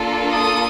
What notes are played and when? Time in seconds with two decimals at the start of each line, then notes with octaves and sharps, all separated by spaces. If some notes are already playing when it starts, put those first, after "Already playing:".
Already playing: A#3 D4 F4 A4
0.32 D#6